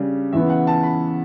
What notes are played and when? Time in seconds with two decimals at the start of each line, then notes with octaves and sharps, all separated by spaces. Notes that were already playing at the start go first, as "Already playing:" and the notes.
Already playing: C#3 G3 D4
0.33 E2 C#3 E3 B3 E5
0.50 F#5
0.67 A5
0.83 B5